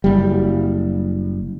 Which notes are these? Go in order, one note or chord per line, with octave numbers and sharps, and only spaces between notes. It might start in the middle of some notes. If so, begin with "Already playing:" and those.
F#1 G3